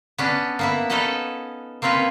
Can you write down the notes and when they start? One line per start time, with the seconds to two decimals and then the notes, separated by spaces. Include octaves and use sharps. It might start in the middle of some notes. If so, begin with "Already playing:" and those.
0.18 B3 C#4 D4
0.59 A#3 B3 E4
0.90 C#4 D#4 A4 B4 D#5 F#5
1.82 A#3 C4 C#4 F4 B4